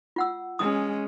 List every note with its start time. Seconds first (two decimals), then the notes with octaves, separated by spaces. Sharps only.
0.16 F4 F#5 E6
0.59 G#3 C#4 D#6